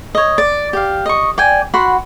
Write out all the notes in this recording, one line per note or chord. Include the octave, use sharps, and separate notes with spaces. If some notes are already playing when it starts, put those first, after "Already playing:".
C#5 D#5
D5
G4 F5
D#5 C#6
D5 G5 G#5
F#4 F#5 B5 C6